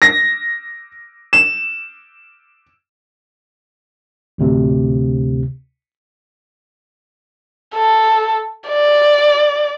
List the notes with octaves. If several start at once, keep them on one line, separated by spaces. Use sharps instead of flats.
A#6
E7
A1 D2 C3
A4
D5